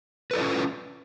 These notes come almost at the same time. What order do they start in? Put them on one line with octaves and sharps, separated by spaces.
B4 A4 D5 F4 C#4